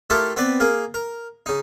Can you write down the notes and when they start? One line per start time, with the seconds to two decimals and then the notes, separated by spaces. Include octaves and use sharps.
0.10 A3 E4 F4 G4 A4 A#4
0.36 B3 C4 B4 D5
0.60 A#3 G#4 A#4
0.94 A#4
1.46 C#3 D#4